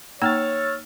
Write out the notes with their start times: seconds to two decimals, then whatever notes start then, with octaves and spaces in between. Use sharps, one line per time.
0.22 A#3 D#4 C#5 G5 E6 F6 A6